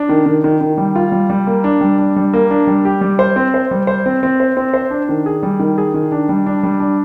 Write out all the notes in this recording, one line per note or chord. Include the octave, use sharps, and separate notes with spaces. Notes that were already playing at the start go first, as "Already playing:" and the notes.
Already playing: D4
D#3
D#3
D#3
D#3
G3
F4
G3
G3
A#3
D4
G3
D4
G3
A#3
D4
G3
G4
G3
C5
C4
C5
G3
C5
C4
C4
C5
C4
C5
D4
D#3
G#4
G3
D#3
G#4
D#3
D4
G3
D4
G3
D4